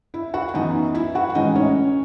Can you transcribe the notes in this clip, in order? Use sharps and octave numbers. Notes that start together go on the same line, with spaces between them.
E4 E5
F#4 F#5
F#2 E3 B3 D#4 D#5
E4 E5
F#4 F#5
A2 E3 G#3 C#4 D#4 D#5
C#4 C#5